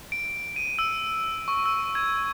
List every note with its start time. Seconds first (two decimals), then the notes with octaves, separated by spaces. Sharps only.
0.12 D7
0.56 D#7
0.79 E6
1.48 C#6
1.66 E6
1.95 G#6